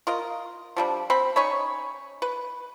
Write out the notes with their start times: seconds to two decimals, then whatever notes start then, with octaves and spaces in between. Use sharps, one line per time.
0.07 F4 A#4 D#5
0.76 F3 G3 D4
1.10 C4 B5
1.36 C#4 D#4 C#5 B5
2.22 B4